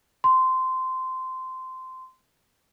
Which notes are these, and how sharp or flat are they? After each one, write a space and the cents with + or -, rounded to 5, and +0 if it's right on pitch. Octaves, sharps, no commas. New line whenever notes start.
C6 -15